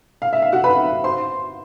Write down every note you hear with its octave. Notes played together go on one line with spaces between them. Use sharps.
F5
E5
F5
F#4 F#5
B4 B5
C5 C6